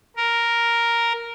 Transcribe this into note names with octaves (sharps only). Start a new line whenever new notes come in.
A#4